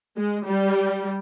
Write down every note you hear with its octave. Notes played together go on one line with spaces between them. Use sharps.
G#3
G3